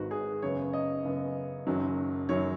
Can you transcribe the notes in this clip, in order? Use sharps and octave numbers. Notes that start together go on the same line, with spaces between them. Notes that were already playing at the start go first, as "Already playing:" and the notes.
Already playing: G#1 G#2 D#3 F#4 B4
G#4
F#2 C#3 B3 C#5
D#5
F#2 C#3 B3
F#1 F#2 D#3 F#3
F#2 D#3 F#3 C#5